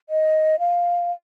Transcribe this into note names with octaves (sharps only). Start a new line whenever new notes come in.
D#5
F5